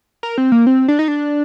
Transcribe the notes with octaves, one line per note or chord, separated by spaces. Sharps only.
A#4
C4
A#3
C4
D4
D#4
D4